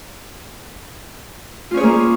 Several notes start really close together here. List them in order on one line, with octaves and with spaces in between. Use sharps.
F4 C#4 C#5 G#4 A#3